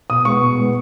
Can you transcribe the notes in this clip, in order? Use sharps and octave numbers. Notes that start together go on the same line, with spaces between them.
B2 D#6
G#3 B3 C#6
B2
G#3 B3